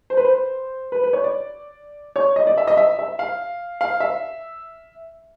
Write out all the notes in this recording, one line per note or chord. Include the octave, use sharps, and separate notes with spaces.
C5
B4
C5
B4
B4
C#5
D5
C#5
D#5
D5
E5
D#5
E5
E5
F5
F5
E5